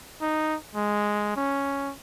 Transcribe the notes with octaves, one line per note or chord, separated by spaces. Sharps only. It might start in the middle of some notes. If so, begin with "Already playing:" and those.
D#4
G#3
C#4